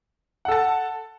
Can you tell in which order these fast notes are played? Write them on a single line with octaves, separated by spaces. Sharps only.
F#5 A4 A5